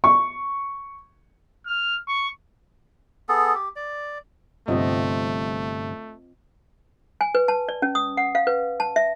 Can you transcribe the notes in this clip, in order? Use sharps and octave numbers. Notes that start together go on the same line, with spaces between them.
C#6
F6
C#6
B3 G#4 A4
G4
D5
G1 C3 A3 C4 F4 D#5
G#5
B4
A5
D5
C#4
D#6
F#5
F5
B4
A5
E5